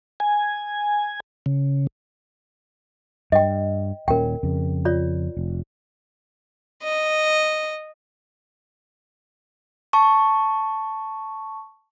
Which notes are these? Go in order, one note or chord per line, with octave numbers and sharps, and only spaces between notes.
G#5
C#3
G2 D#5 G5
D#1 A#2 C#4 A#4 G5
F2 C#3
F4 C#5 D5
F1
D#5
A5 C#6